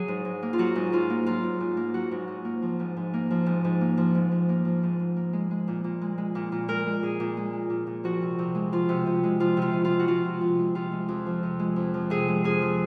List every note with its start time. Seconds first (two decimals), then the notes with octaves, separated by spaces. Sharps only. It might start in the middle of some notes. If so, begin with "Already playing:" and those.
Already playing: F#3 G#4
0.08 G#2
0.25 G#2
0.42 A#3
0.53 F4
0.58 F#3 F#4
0.75 G#2
0.92 G#2 F4
1.10 A#3
1.26 F#3 F4
1.43 G#2
1.60 G#2
1.77 A#3
1.94 F#3 F#4
2.11 G#2
2.28 G#2
2.45 A#3
2.62 F3
2.79 G#2
2.97 G#2
3.14 A#3
3.31 F3
3.46 G#2
3.64 G#2
3.81 A#3
3.97 F3
4.15 G#2
4.32 G#2
4.49 A#3
4.65 F3
4.83 G#2
4.99 G#2
5.16 A#3
5.33 G#3
5.51 G#3
5.68 A#2
5.84 A#2
6.01 G#3
6.18 G#3
6.35 A#2
6.52 A#2
6.68 G#3 A#4
6.86 G#3
7.03 A#2 G#4
7.20 A#2
7.37 G#3
7.53 G#3
7.70 A#2
7.87 A#2
8.04 F3 F#4
8.22 C3
8.39 C3
8.55 G#3
8.72 F3 F4
8.89 C3
9.06 C3
9.23 G#3
9.40 F3 F4
9.57 C3
9.62 F4
9.73 C3
9.85 F4
9.90 G#3
10.00 F#4
10.07 F3 F4
10.25 C3
10.41 C3
10.59 G#3
10.75 C3 F4
10.92 G#3
11.08 F2
11.26 F3
11.43 C3
11.60 G#3
11.76 F2
11.94 F3
12.10 C3 G#4
12.28 G#3
12.44 F2 G#4
12.62 F3